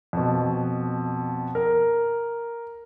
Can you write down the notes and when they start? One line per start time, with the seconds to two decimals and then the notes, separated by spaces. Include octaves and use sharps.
0.13 F2 B2
1.55 A#4